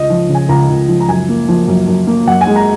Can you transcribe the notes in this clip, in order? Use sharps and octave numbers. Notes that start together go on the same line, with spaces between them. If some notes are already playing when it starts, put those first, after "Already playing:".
Already playing: C#2 D#5
F3
C#3
G#5
C#2 A#5
C#2
F3
A#5
F#2 G#5
A#3
F3
F#2
F#2
A#3
F#2 F#5
G#5
G#3
A#5